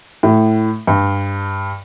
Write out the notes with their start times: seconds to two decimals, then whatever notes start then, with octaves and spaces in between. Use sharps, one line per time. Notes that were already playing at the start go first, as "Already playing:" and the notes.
0.23 A2
0.87 G2